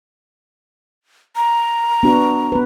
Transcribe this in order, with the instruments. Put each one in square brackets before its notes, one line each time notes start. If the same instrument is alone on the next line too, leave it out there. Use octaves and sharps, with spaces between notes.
[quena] A#5
[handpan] B3 D4 F#4
B3 B4